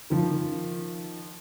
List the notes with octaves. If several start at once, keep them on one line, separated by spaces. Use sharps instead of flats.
D#3 F3